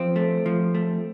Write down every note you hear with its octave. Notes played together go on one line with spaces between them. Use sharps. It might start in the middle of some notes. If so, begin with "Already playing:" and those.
Already playing: F3 C4
A3
F3
A3